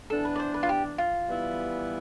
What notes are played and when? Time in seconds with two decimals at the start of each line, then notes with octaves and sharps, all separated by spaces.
0.10 E3 B3 D4 A4
0.25 B4
0.36 D5
0.40 C5
0.54 B4
0.63 F4
0.69 G4
0.98 F4
1.28 E3 G3 B3 E4